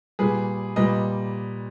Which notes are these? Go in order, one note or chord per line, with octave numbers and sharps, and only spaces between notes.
A#2 G3 G#4 B4
A#2 G3 B4 D#5